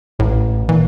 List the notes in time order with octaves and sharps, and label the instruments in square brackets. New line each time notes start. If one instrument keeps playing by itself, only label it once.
[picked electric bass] A1 [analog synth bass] A2
[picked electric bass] A#2 [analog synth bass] E3